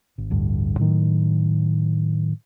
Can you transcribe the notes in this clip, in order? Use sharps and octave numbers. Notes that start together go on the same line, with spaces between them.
G#1
A1 D2 G2
A2 D#3 F#3